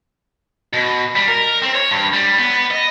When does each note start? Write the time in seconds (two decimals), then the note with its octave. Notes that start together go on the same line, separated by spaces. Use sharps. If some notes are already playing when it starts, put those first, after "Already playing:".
0.73 B2
1.16 G3
1.28 A#4
1.62 C4
1.75 C#5
1.91 G2
2.13 G3
2.38 B3
2.71 D#5